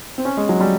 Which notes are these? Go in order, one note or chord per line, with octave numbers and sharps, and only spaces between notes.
C4
C#4
G#3
F#3
G3